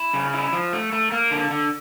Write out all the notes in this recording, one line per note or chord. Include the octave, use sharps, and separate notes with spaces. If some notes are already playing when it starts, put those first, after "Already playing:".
Already playing: E4
C#3
E4
F3
A3
A3
A#3
D3
D3